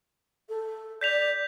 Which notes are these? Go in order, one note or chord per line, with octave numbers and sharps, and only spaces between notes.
A4
D5 G6 B6 F7